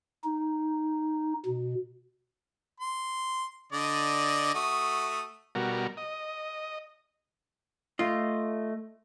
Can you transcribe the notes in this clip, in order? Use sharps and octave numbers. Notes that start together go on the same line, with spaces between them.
D#4
B2
C6
D3 D5 D#5
A3 F#4 D#6
B2 G3 F#4 A#4
D#5
A3 F4 D#5